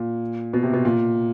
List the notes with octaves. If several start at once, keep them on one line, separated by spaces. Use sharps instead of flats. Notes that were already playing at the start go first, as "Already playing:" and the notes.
Already playing: A#2
B2
C3
B2
A#2